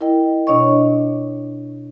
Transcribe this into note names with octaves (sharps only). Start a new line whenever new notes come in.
E4 A#4 D#5 G5
B2 D4 C#5 D#5 C#6